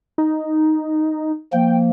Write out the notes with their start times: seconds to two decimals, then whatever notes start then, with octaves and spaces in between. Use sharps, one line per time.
0.18 D#4
1.53 F3 A#3 G5